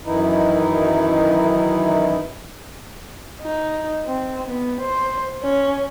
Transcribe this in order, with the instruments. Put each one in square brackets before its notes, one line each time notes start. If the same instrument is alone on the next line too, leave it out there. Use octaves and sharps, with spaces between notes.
[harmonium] F#2 D#3 E3 D#4 E4
[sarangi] D#4
C4
B3
C5
C#4